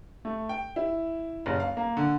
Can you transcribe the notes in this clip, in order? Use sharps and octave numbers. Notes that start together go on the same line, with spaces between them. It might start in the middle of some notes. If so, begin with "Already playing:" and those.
A3
G5
E4
F#1
F5
A#3
D3